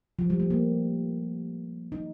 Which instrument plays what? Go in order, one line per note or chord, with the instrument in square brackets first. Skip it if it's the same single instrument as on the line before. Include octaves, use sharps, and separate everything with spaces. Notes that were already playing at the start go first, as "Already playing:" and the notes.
[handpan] F3
G3
A3
A#3
D#4